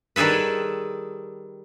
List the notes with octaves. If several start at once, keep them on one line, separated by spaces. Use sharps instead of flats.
D#3 G3 G#4 A4 B4